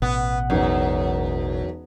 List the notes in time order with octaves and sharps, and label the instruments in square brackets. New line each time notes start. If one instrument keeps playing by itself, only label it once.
[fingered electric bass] A1 B2 [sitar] B3
[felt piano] E1 D#4 [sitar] F#2